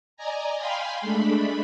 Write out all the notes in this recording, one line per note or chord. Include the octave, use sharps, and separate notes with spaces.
D5 D#5 G#5 A#5
F5 G5 G#5 B5 C6
G#3 A3 D4 B5